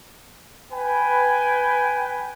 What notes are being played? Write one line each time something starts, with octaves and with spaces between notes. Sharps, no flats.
B4 G5 G#5